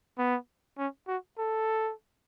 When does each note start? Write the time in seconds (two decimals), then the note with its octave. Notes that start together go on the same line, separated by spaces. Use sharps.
0.18 B3
0.78 C#4
1.08 F#4
1.38 A4